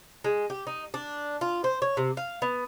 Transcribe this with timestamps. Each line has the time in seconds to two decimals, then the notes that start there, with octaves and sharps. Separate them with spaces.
0.24 G#3
0.50 G4
0.67 D#4
0.94 D4
1.41 F4
1.64 C5
1.82 C#5
1.97 C3
2.17 F5
2.42 B3